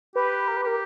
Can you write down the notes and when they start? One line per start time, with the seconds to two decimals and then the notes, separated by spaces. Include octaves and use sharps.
0.16 G4 B4
0.48 A#4
0.56 B4
0.63 G4 A#4